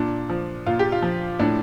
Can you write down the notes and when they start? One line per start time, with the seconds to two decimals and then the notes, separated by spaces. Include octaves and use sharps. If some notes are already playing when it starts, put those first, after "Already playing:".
Already playing: A#2 D4
0.29 F3
0.66 A#2 F4
0.79 G4
0.92 F4
1.02 F3
1.39 A2 D4